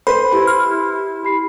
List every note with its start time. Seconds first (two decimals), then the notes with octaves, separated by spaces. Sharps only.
0.07 B4 C5 B5
0.32 E4 G4 C6
0.47 F6
1.23 G4 B5 C7